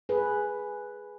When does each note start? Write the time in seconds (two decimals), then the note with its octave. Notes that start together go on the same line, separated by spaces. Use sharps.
0.09 G#4 B4